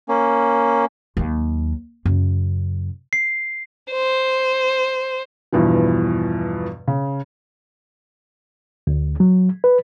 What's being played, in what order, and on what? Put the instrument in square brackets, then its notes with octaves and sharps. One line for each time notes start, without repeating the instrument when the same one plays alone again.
[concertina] A#3 C#4
[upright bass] D#2 F#3
F#2 C#3
[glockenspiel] C7
[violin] C5
[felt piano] E2 G2 B2 E3 F3
C#3
[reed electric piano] D2
F#3
B4